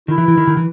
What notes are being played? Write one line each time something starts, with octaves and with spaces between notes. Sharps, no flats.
D#3 E4
E3
E3
D#3
D#3
E3